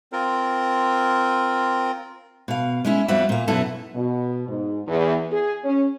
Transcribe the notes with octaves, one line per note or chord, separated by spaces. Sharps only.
C4 F4 A#4
B2 F5
G#3 C#4 E4
F2 G3 B3 F#4 E5
A#2 A#3
F#2 B2 B3 E4 A4
B2
G#2
E2
G#4
C#4